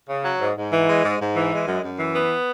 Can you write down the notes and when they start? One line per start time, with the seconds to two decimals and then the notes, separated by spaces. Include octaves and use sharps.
0.09 C#3
0.24 F#3
0.40 G#2
0.57 G#2
0.72 E3
0.88 G#3
1.04 G#2
1.20 G#2
1.36 E3
1.52 G#3
1.68 F#2
1.84 F#2
1.99 E3
2.15 B3